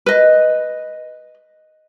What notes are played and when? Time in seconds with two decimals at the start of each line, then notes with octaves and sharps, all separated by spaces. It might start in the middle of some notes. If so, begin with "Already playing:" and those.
0.06 B4 D#5